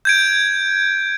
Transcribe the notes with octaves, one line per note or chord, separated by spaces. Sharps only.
G6 G#6 D7